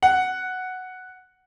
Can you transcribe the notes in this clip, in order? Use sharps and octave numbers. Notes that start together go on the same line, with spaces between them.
F#5